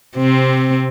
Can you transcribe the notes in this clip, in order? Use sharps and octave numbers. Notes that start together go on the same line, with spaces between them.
C3 C4